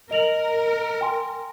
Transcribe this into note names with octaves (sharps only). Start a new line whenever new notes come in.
A#4 D#5 F7 F#7
G5 G#5 C6